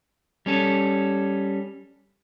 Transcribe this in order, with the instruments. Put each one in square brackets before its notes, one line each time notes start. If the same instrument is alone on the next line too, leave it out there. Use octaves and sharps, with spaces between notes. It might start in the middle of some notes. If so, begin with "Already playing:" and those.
[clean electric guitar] G3 C#4 A4